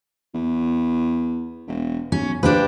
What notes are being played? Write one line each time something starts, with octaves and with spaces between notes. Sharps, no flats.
E2
E1
B1 C#4
F3 D4 G4 B4